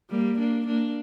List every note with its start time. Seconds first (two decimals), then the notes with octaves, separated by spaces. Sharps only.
0.10 G3 A#3
0.38 A#3 D4
0.67 A#3 D4